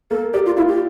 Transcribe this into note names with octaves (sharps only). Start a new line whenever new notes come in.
A#3 A4
G4 D5
F4
E4 F4
G4